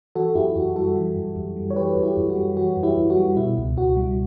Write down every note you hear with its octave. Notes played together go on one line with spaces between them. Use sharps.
E3 F#4 A4
F#2 E4 G4
F#2 F#4
G3 F#4 A4
E3
F#2
F#2
G3
C#5
E3 G4 B4
F#2
E4 G4
F#2
F#4
G3
E3 F#4
F#2
E4 G4
F#2
F#4
G3
B2 E4
C#2
C#2 F#4
G3